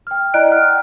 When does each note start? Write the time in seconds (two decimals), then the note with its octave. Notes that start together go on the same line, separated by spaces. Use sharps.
0.07 G5 F6
0.34 E4 D5 D#5 A#5 F#6 D7
0.51 F#5 G5 F6